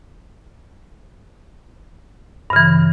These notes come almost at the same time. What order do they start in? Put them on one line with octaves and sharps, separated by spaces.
G2 C#3 E3